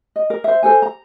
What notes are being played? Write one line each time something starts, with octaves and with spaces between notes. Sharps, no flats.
D#5
A#4
C5 E5
A4 C5 G#5
A#5